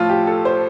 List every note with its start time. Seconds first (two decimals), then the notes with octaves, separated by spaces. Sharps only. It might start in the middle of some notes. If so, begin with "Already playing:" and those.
Already playing: A2 F3 F4
0.09 G4
0.27 A4
0.45 C5